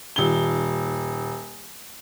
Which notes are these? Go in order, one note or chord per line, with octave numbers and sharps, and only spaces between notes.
D#1 G7